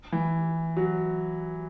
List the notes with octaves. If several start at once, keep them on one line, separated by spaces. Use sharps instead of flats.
E3
F#3